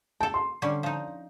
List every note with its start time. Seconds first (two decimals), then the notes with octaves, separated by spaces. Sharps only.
0.21 A4 G5 A5
0.34 C6
0.62 D3 G3 C#4
0.83 F3 D#4